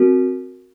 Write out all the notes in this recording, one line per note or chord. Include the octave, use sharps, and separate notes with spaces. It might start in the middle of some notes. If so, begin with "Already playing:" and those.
Already playing: C4 F#4 A#4